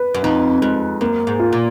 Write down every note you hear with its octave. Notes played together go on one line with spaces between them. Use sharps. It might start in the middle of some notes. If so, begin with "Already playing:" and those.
Already playing: B4
F#2
F2 D#4
F2 G#3
F#2 A#3
G#2
F4
A#2